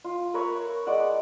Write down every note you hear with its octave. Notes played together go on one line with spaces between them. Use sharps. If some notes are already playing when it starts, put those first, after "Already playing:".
F4
A#4 B4 C#5 E5
G#3 D5 F#5